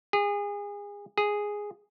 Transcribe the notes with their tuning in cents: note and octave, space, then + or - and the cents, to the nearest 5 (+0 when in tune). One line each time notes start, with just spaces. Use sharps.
G#4 -30
G#4 -5